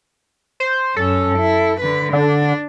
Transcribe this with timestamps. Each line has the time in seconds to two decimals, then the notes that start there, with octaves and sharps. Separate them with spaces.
0.60 C5
0.96 F#2 C#4 A4
1.39 E4
1.81 D3 B4
2.13 D3 D4